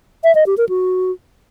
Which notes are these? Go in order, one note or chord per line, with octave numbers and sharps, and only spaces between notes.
E5
D#5
G4
A#4
F#4